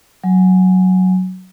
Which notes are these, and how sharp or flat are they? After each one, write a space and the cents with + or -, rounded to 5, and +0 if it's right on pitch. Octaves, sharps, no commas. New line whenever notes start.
F#3 +0 G#5 +0